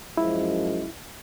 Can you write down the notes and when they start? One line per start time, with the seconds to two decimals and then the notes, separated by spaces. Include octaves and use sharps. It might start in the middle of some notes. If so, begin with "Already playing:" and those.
0.17 F#2 F3 G#3 E4